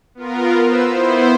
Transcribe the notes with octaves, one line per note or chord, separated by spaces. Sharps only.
B3 F4 A#4
B4 C5 E6
B3 E4 C5